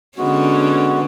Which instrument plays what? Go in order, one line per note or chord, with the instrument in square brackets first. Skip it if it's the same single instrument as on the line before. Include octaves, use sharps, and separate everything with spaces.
[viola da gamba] D3 C#4 [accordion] G#3 B3 F#4